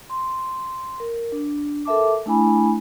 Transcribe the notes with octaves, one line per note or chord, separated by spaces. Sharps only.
C6
A#4
D4
A4 A#4 E5 A5 D6
A3 D4 E4 G#5 B5